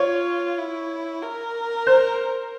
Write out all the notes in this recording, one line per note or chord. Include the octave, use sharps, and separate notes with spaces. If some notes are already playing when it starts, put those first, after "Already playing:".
Already playing: F4 C#5
E4
A#4
C5